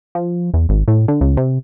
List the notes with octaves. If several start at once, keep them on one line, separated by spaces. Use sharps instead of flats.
F3
E2
G#1
A2
D3
C#2
C3